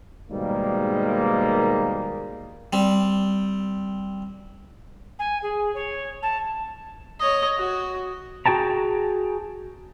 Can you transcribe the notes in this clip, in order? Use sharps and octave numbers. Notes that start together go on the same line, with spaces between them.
G#2 B2 D#3 G3 G#3 A#3
G3 C4
G#5
G#4
C#5
A5
C#5 D#5
F#4
F#4 G#4 G5 A5 A#5